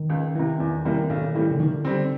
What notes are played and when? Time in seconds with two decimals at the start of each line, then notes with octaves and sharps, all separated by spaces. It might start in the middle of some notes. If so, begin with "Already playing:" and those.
Already playing: D#3
0.10 C#2
0.35 C3 E3
0.60 E2
0.85 C3 E3 G3 A#3
1.10 B1
1.34 A2 E3 G3
1.51 C#3
1.60 D3 D#3
1.85 G3 C4